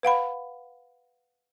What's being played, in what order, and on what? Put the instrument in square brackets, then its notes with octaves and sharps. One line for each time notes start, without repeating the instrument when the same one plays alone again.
[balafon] B4 F5 F#5 B5